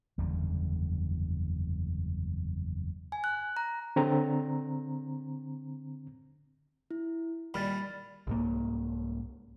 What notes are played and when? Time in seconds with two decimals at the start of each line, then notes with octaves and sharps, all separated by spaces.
0.18 F#1 E2 D3 G3
3.12 G#5
3.24 F#6
3.57 A#5
3.96 D3 C4 A#5
6.91 E4
7.54 A#2 D#3 G3 B5 F6 A6
8.27 C2 G#2 A#3